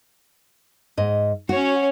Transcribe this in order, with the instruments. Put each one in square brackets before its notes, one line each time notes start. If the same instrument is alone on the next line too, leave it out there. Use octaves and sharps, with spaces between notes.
[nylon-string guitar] G#2 D#5
[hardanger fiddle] C#4 C#5 [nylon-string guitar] F#4